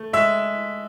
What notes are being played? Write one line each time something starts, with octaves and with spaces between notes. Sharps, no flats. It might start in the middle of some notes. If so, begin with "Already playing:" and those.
Already playing: A3
G#3 E5 E6